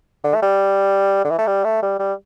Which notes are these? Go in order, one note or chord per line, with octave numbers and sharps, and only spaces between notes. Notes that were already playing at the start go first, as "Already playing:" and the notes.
D3
A3
G3
D3
E3
A3
G3
A3
G3
G3